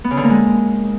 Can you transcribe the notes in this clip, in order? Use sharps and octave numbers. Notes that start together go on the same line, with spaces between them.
B3
C#3
D3
A#3
G#3